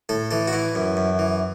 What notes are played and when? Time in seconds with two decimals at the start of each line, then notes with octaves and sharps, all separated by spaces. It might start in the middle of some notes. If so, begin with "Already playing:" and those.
0.09 A2 A4
0.31 E3 A4
0.48 F#4
0.53 E3 E4
0.75 F#2
0.97 F#2
1.19 E3